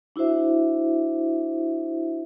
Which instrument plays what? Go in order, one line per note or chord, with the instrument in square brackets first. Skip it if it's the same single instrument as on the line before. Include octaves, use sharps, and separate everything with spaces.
[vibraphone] D4 E4 F#4 C5 E5